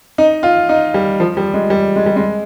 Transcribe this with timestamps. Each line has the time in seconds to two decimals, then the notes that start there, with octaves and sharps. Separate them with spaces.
0.18 D#4
0.43 F4
0.69 D#4
0.94 G3
1.20 F3
1.37 G3
1.54 G#3
1.70 G3
1.96 G#3
2.06 G3
2.16 G#3